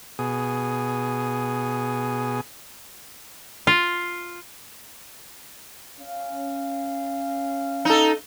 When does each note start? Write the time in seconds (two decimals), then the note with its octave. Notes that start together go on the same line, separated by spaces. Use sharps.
0.19 B2 G#4
3.67 F4
6.00 C#4 F5
7.85 D#4 A4